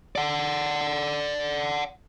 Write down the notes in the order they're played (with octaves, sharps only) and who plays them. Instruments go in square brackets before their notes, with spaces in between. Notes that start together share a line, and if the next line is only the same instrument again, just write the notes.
[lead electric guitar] D5 F#5